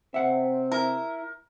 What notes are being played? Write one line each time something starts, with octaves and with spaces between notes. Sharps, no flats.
C3 C4 E5 F#5
E4 A#4